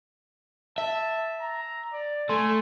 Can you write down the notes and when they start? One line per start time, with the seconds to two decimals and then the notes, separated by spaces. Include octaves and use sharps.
0.78 E5 A5
1.41 A#5
1.93 D5
2.29 A3 G#5 C6